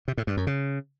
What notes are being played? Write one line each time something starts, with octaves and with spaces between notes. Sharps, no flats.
C3
A2
G2
F#2
C#3